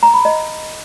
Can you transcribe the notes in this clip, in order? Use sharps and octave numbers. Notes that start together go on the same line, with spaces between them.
A#5
B5
D#5